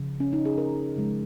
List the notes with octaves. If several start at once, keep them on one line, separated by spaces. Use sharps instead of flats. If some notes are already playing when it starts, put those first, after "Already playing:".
Already playing: C#3 F3
C#4
D#4
G#4
A#4
C#3 F3 G#3